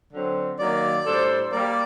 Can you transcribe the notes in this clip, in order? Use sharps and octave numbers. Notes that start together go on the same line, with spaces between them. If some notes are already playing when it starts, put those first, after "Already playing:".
D3 F#3 C4
D#3 F#3 A#3 D5
A2 G3 D4 A4 C5
G3 A#3 D5